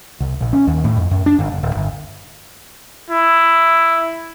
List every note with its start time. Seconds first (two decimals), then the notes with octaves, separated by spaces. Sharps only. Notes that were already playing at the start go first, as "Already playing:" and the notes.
0.20 C2
0.41 A#1
0.53 C#4
0.67 D#2
0.84 A2
0.96 F2
1.11 F#2
1.26 D4
1.39 G1
1.52 F#1
1.63 D1
1.75 G1
3.10 E4